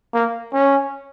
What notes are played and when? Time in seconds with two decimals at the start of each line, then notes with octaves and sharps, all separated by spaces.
0.13 A#3
0.53 C#4